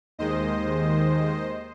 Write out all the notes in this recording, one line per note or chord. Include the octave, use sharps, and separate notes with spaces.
D#2 D#3 G#3 C5 D#5